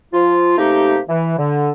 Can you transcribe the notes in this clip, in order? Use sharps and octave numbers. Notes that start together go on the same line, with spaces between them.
F3 F4
C3 A3 A#3 D#4 G4
E3
D3